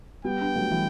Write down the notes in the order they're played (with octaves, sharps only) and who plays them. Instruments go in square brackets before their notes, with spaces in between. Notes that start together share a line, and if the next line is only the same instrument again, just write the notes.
[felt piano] G3 B3 [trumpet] G5
[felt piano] B3 D4
F#3 A3
E3 G3